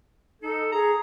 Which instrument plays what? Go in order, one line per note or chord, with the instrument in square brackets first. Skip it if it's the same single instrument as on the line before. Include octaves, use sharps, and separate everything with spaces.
[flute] D#4 [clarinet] A4
[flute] G#4 [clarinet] A#5